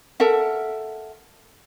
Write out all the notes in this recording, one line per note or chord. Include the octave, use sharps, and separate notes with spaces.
A4 A#4 E5 F#5